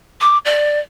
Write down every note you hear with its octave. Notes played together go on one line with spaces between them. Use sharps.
D6
D5